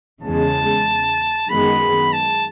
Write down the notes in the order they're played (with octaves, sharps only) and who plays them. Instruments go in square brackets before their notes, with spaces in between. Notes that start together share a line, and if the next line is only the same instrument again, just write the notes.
[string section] E2 C#3 G#3 [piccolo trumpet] A5
[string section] F#2 D#3 G#3 B3 [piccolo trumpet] B5
[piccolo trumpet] A5